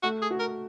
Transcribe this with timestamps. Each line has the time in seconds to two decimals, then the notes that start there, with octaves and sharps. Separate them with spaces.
0.03 A3 F#4
0.22 G#4
0.31 F#4
0.39 A#4